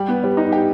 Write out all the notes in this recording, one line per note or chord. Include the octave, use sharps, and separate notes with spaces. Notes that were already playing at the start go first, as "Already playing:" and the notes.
Already playing: G3 G4
B3
G3
D#4
G4